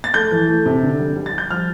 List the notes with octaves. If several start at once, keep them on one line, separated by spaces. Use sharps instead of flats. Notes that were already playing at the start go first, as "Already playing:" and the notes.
A6
A3 G6
E3
A3
C3
D3
G3
G3
A6
G3 G6
F3 F6